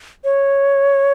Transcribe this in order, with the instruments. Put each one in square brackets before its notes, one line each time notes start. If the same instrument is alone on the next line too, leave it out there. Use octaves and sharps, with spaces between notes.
[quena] C#5